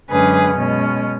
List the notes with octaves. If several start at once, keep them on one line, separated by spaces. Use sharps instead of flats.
F#2 D3 G#3 C#4 G#4 B4
B2 G#3 C#4